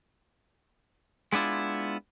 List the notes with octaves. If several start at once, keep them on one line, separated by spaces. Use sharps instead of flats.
G#3 B3 D4 E4 F4